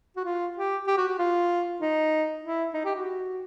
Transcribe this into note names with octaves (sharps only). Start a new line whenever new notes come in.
F#4
F4
G4
G4
F#4
F#4
F4
D#4
E4
D#4
G4
F#4